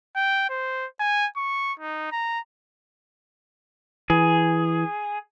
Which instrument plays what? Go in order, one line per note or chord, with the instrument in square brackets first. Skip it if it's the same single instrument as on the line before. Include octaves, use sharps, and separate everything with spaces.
[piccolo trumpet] G5
C5
G#5
C#6
D#4
A#5
[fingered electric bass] E3 [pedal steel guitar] G#4